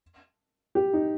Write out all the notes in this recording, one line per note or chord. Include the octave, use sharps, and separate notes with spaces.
G4
D#4